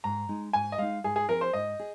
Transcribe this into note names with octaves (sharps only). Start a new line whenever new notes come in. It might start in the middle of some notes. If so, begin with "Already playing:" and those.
G#2 A#5
G#3 D#4
G#2 G#5
D#5
G#3 D#4 F5
G#2 G#4
G#4
F3 C4 G#4 A#4
C5
G#2 D#5
G#4